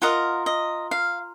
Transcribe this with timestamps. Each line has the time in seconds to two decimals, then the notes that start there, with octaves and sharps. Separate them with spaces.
0.02 F4 A#4 D#5 F#5
0.46 D#5
0.91 F5